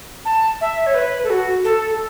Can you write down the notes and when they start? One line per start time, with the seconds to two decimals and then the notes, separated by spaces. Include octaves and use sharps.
0.25 A5
0.61 E5
0.86 C#5
0.95 B4
1.24 A4
1.30 F#4
1.64 A4